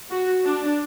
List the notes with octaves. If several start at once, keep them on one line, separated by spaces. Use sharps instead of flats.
F#4
D4